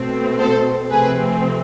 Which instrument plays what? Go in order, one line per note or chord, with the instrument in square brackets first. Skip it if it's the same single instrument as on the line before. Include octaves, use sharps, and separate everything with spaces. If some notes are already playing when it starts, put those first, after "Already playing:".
Already playing: [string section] B2 A3 C4
A4 C5
C3 F3 A3 C4 G#4 B4